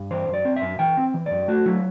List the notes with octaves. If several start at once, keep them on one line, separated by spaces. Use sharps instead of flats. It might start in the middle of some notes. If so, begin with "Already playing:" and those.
Already playing: G2
E3 C5
F#2
D5
C4
E5
F#2
E3 G5
C4
E3
F#2 D5
A3 F#4
F#3 E4